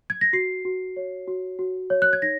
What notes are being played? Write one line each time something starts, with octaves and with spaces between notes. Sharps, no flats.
G#6
A#6
F#4 C7
F#4
C#5
F#4
F#4
C#5
F#6
G#6
D#4 A#6